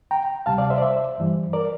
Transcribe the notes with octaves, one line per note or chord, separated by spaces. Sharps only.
G5 A#5
D2 C3 G3 F5 A5
D5 F5
C5 E5
D5
C5 E5
G2 E3 G3
A#4 D5